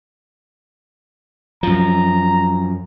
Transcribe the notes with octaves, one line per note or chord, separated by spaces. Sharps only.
F#2 F3 A#5